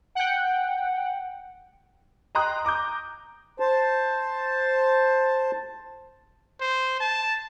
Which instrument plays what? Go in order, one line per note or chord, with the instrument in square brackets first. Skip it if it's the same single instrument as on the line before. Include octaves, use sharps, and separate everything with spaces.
[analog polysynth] F#5 G5
[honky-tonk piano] D#5 G5 A#5 C6 D#6 F#6
A#5 D6 D#6 G6
[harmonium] C5 A5
[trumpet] C5
A5